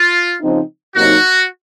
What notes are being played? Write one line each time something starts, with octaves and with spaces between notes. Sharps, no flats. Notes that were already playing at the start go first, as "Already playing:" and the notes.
Already playing: F4
C#3 F3 C4 D#4
C3 F#3 A#3 D#4 F#4